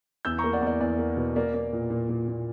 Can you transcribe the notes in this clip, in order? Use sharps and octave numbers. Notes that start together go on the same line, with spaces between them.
E2 E6 G6
A#5 C#6
A#3
D5 F#5
E2
D5
E2 D5
A#3
B2
A#3 D5
A#3
A#2
A#2
A#2
A#2